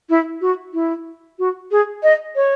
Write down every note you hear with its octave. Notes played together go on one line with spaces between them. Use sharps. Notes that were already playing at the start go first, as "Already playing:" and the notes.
E4
F#4
E4
F#4
G#4
D#5
C#5